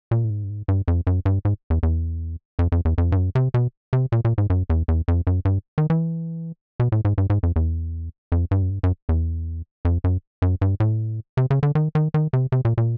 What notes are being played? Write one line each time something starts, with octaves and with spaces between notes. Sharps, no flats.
A#2
A2
G#2
G2
G#2
G2
F2
F#2
G2
G#2
E2
E2
F2
F2
E2
F2
G2
F#2
C3
B2
C3
A#2
A#2
G#2
F#2
E2
E2
F2
F#2
G2
D#3
E3
B2
A2
G#2
G2
G#2
F2
E2
F2
G2
F#2
G2
F#2
E2
F2
F#2
F#2
G2
A2
C3
C#3
D3
D#3
D#3
D#3
C3
C3
A#2
A#2